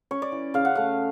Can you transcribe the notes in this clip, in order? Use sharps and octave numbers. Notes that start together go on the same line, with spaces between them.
C#4 C#5
D5
E3
C#3 F5
F#5
A3 F5